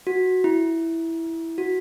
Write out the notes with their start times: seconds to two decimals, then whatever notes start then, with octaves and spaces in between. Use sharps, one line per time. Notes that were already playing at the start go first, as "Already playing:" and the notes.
0.07 F#4
0.44 E4
1.58 F#4